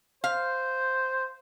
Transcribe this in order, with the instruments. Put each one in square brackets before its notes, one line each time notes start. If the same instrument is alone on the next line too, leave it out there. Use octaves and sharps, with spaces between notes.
[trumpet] C5 [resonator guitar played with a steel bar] F5